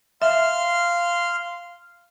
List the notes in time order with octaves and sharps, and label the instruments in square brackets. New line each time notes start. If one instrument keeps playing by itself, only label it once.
[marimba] E5 [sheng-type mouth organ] F5 C6 F6